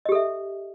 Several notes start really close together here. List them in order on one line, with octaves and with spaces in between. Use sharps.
D#5 G4 A4 E5